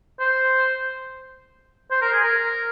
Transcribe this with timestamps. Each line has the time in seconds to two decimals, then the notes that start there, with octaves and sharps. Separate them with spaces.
0.20 C5
1.91 C5
2.02 A#4
2.13 G#4
2.24 A#4